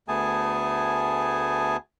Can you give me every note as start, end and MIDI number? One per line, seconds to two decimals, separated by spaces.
0.08 1.77 38
0.08 1.77 57
0.08 1.77 59
0.08 1.77 68
0.08 1.77 80
0.08 1.77 81